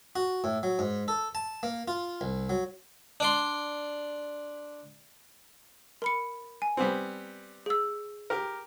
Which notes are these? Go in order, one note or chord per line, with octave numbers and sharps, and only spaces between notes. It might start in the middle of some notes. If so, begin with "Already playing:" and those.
F#4
A2
F#3
G#2
A4
A5
A#3
F4
C2
F#3
D4 D5 C6
A#4 B5 C#7
G#5
G3 B3 C4
G#4 E6
G4 A#4